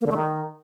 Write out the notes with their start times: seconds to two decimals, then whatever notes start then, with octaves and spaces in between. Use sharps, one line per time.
0.01 A#3
0.06 D3
0.11 A3
0.16 D#3